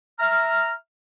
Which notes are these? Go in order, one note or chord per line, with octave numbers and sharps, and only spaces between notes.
E5 A#5 F6